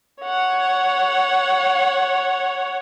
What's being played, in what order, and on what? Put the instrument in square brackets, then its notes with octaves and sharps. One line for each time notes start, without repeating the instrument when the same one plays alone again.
[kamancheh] C#5 F#5